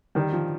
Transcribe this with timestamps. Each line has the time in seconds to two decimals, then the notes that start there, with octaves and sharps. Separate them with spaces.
0.15 D#3 G3
0.33 F3